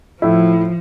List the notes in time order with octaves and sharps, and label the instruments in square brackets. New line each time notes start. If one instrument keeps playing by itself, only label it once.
[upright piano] A2 E4 [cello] F3